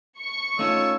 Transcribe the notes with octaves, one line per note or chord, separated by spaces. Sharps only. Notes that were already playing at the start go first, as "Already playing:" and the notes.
C#6
A3 C#4 D#4 F4 C#5 E6